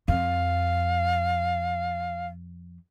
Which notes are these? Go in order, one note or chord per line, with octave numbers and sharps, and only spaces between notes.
F2 F5